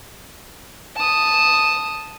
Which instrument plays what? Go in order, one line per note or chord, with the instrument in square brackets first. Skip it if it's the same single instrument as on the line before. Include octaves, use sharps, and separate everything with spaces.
[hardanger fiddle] A5 D#6